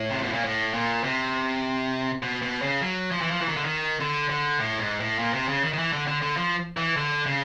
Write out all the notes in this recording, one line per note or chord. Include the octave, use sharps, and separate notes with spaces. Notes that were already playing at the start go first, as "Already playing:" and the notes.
Already playing: A2
C3
B2
A#2
A2
A#2
C3
B2
B2
C#3
F#3
F3
E3
F3
E3
D#3
D3
D#3
D3
D3
A2
G#2
A2
A#2
C3
C#3
D#3
D#3
E3
D3
D3
D3
F3
E3
D3
C#3